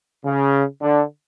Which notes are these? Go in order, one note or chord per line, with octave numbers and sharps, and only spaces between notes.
C#3
D3